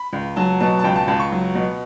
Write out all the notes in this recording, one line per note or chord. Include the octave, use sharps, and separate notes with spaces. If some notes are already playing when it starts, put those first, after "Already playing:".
Already playing: B5
C#2
F#3 A5
B2 A5
A5
C#2 G5
A5
C#2 A5
C#6
F#3
B2